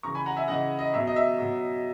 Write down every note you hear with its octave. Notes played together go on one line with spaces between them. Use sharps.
C#3 E3 A#5 C#6
G#5 B5
F#5 A#5
E5 G#5
C#3 E3 D#5 F#5
D#5
B2 F#3 E5
D#5
E5
B2 F#3